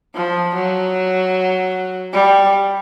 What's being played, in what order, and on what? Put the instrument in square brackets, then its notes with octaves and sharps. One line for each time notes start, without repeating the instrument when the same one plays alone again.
[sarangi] F3
F#3
G3